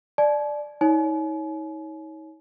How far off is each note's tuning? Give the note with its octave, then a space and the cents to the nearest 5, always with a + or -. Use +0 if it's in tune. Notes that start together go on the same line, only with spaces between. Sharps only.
D5 +10 A5 -45
D#4 +40 C#5 +0 G#5 +40